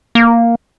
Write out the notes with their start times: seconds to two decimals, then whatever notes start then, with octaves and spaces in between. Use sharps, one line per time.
0.15 A#3